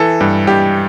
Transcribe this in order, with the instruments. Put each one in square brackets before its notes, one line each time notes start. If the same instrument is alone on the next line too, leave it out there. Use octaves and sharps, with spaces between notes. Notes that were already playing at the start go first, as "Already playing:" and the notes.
Already playing: [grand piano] E3 A4
G2
G2 G4